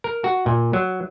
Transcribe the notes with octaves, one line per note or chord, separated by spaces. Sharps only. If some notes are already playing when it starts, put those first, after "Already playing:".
A#4
F#4
A#2
F#3